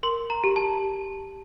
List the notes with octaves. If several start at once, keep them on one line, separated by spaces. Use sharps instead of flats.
A#4 C6
A#5
G4
A5